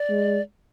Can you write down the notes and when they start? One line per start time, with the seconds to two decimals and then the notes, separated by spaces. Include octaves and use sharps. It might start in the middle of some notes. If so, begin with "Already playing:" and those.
Already playing: D5
0.10 G#3